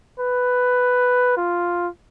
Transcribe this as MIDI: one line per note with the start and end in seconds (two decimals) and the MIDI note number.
0.20 1.36 71
1.37 1.88 65